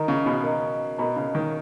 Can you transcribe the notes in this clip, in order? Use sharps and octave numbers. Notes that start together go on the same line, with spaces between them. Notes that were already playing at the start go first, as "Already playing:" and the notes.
Already playing: D#3 A#4 D#5 A#5
C#3
B2
A#4 D#5 A#5
B2 A#4 D#5 A#5
C#3
D#3